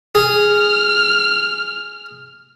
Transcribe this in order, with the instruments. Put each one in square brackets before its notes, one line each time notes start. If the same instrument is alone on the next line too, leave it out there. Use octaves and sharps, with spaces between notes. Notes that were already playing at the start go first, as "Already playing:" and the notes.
[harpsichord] G#4 [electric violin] F6